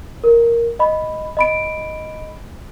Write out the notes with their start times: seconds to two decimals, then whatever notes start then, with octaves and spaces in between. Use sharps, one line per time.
0.24 A#4
0.79 D#5 B5
1.37 D#5 B5 D7